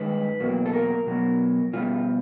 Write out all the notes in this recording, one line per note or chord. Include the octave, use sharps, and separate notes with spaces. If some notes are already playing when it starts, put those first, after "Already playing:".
Already playing: G2 D#3 G#3 B4
E2 B2 F#3 A#3
A4
A#4
B2 F#3 B3
B2 G3 B3 F4